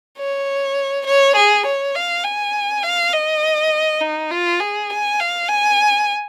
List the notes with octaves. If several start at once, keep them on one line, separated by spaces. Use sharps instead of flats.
C#5
C#5
G#4
C#5
F5
G#5
F5
D#5
D#4
F4
G#4
G#5
F5
G#5